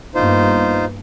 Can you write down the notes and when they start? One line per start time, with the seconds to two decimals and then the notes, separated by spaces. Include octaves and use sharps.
0.15 G2 A#3 B3 D#4 F4 C5